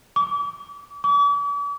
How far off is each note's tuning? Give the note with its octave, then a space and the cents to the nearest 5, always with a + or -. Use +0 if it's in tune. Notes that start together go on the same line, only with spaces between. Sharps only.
D6 -35
D6 -45